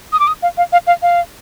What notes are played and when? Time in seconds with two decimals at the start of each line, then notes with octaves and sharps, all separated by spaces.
0.12 D#6
0.20 D6
0.27 D#6
0.42 F5
0.57 F5
0.72 F5
0.87 F5
1.02 F5